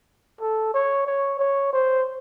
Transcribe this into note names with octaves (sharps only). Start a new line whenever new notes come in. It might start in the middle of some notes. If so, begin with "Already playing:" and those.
A4
C#5
C#5
C#5
C5